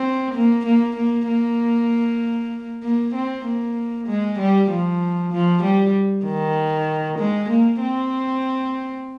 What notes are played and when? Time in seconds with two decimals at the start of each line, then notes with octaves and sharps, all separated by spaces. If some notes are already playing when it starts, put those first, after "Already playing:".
Already playing: C4
0.34 A#3
0.66 A#3
0.97 A#3
1.28 A#3
2.83 A#3
3.15 C4
3.45 A#3
4.08 G#3
4.39 G3
4.70 F3
5.33 F3
5.63 G3
6.26 D#3
7.19 G#3
7.50 A#3
7.81 C4